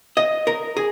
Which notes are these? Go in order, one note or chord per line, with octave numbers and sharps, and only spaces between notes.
D#5
A#4
G#4